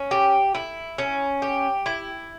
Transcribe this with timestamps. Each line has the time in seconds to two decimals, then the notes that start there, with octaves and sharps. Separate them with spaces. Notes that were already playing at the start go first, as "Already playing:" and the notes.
Already playing: C#4
0.11 G4
0.55 E4
0.98 C#4
1.42 G4
1.86 E4